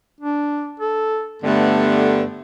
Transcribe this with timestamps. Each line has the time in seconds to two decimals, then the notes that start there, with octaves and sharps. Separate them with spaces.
0.21 D4
0.80 A4
1.43 G2 D3 A3 B3